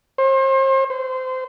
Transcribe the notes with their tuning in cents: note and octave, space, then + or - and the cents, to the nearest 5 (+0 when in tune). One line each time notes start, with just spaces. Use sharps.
C5 +35
C5 -25